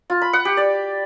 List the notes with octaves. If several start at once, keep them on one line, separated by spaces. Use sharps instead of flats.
F4
B5
F#5
G4
D5